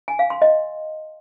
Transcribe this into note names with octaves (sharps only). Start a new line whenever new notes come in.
G#5
F5
C6
D#5